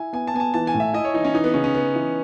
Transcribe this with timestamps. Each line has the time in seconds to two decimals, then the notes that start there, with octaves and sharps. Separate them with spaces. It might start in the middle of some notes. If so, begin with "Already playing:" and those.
Already playing: E4 G#5
0.13 B3 G#5
0.27 A5
0.34 B3 G#5
0.40 A5
0.54 E3 A5
0.67 G#5
0.74 A2
0.80 E5
0.94 E4 D#5
1.05 C#5
1.14 E3 D#4
1.25 C#4
1.34 E3 D#4
1.44 B3
1.54 C#3 C#4
1.64 C#4
1.75 C#3 B3
1.95 E3